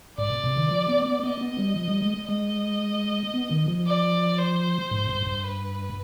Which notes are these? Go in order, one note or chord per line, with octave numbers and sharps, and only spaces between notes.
G#2 D5
B2
C3
D#3
F3
B3
B3
B3 D#5
B3
G3
F3
G3
G#3
G#3 D#5
B3
D#3
F3
D5
C5
G#2
G2
G2
B4